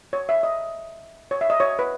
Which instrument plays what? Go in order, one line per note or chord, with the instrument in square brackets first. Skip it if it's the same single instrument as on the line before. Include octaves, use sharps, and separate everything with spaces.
[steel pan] C#5
E5
D#5
C#5
E5
D#5
C#5
B4